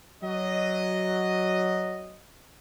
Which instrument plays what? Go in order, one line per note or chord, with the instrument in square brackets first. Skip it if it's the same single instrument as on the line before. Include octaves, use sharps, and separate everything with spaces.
[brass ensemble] F#3 D#5